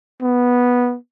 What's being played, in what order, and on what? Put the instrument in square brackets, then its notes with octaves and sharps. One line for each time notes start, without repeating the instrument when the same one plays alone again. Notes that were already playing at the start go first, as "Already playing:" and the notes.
[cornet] B3